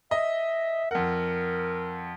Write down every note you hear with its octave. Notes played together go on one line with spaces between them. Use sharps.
D#5 E5
F2 A#4 F#5